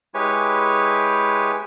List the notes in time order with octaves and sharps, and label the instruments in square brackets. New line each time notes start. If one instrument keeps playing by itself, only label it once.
[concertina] G#3 E4 G4 B4 C#5 G#5